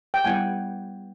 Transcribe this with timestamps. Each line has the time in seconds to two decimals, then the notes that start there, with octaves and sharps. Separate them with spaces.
0.14 G5
0.25 G3 B3 E4 F#5 G#5